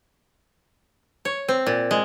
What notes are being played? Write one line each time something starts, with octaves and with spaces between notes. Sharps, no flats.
C#5
C4
A#2
G#3